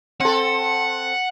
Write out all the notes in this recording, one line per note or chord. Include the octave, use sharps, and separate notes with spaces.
C4 A4 F#5